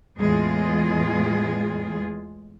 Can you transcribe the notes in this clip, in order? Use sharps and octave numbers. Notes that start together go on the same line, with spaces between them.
E2 A2 E3 G#3 F4 G#4